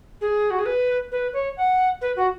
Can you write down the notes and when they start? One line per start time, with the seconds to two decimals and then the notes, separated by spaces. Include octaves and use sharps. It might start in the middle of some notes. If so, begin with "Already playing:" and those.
0.21 G#4
0.51 F#4
0.59 G#4
0.66 B4
1.12 B4
1.33 C#5
1.57 F#5
2.01 B4
2.16 F#4